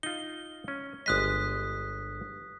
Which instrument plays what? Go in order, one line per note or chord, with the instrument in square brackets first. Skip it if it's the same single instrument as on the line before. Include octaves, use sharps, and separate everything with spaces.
[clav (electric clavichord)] D#4 F4 [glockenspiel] G7
[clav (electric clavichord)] C#4
[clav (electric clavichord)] G1 G#3 D#5 [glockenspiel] D#6 F#6 B6